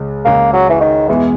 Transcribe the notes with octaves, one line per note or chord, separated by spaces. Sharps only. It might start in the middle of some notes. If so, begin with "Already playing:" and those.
Already playing: C#2 C#3 G#3
C#2 C#3 G#3 A#3
F#3
E3
D#3
E2 B2 E3 G#3 B3